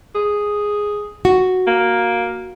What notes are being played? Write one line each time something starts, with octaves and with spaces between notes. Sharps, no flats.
G#4
F#4
A#3